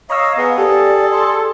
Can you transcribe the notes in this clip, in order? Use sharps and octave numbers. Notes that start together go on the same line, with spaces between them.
C#5 D#5 F5 A#5 E6
B3 G#4
G4 A4 D5
C6